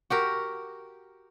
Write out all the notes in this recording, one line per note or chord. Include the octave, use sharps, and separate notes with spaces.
F#4 G4 A#4